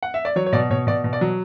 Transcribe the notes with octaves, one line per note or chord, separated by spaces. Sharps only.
F#5
E5
D5
F#3 C#5
C#5
B2 D5
B2 C#5
B2 D5
B2
D5
F#3